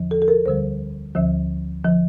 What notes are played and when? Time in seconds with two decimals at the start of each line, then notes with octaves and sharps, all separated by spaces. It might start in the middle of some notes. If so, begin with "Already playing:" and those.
Already playing: E2 D3 F3
0.11 A4
0.22 A4
0.28 A#4
0.45 D2 D3 G3 C5
1.15 D2 D3 F3
1.84 D3 F3